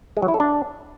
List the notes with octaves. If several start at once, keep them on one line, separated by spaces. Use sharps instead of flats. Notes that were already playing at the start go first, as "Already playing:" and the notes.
G#3
F#3
E4
A4
D4